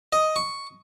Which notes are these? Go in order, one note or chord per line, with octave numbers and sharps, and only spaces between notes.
D#5
C#6